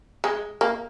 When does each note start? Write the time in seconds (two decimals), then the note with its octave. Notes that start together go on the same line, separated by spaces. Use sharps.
0.24 G#3
0.61 A#3